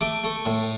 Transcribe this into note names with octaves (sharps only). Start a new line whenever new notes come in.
A3 D6
A3
A2